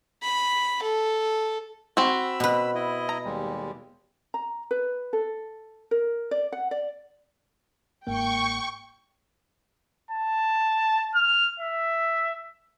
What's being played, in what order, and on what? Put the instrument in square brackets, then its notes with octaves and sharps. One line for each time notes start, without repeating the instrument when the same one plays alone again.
[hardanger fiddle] B5
A4
[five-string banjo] C4 F#4 [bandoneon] B5 E6
[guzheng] B2 B4
[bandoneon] E4 D#5
[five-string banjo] A#5
[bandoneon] D#2 G3 G#3
[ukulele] A#5
B4
A4
A#4
D5
F#5
D5
[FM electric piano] G1 G#2 A#3 [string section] G5 [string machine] C#6
[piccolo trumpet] A5
F6
E5